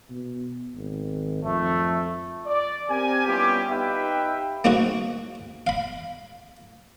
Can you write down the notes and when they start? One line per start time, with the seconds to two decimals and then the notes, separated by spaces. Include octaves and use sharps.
0.10 B2
0.75 G#1
1.45 F2 A3
2.46 D5
2.90 C4 G4 A#4 G#5
3.26 G3 B3 C#4 E4 F4 G4
3.70 D#4 G4 B4 E5 F5 G5
4.64 A#3 C4 D#4 F#4 G#4
5.67 F5 B5